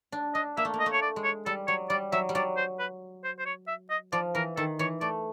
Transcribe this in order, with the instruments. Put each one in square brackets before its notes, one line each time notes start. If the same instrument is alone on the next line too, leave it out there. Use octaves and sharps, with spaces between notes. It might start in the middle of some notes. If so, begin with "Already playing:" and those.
[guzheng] D4
[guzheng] D4 [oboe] D#5
[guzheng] A#3 [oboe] E5
[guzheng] A3
A#3
[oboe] D#5
[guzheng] A3
[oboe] C#5
D5
[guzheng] G#3
[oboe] C#5
[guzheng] G3 [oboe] A4
[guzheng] F#3 [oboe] C#5
[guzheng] G3 [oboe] D5
[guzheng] F#3 [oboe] E5
[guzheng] G3
[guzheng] F#3 [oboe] D5
[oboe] C5
B4
C5
C5
C#5
E5
D#5
[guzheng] F3 [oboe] D5
[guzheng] E3 [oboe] A#4
[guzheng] D#3 [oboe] A4
[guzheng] E3 [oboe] C#5
[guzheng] A3 [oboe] D5